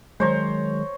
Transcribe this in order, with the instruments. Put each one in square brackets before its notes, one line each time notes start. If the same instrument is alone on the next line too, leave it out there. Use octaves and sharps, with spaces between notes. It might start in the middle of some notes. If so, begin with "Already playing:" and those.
[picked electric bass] D#3 F#3 G#3 [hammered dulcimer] C5 C#5 A#5